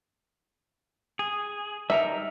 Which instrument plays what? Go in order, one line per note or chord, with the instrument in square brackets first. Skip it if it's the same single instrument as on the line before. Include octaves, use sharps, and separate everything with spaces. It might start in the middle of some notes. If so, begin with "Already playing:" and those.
[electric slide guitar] G#4
[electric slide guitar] G3 D#4 A#4 [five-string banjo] E5